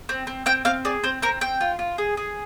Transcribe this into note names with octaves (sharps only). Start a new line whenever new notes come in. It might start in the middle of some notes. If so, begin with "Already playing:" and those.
C4
C4
C4 G5
C4 F5
G#4 D5
C4 C5
C4 A#4
C4 G5
F4
F4
G#4
G#4